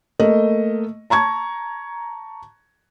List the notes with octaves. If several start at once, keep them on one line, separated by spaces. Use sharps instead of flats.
A3 A#3 D#5
A5 A#5 C#6 G#6